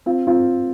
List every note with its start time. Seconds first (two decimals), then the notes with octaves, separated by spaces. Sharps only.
0.06 C4 F4
0.27 C4 F4